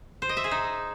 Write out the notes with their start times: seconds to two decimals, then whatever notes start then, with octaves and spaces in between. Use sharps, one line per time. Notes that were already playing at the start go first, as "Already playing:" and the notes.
0.22 C5
0.29 D#5
0.37 E5
0.44 G#4
0.52 D#4